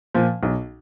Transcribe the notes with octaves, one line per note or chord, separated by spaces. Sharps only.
A#2 F3
B1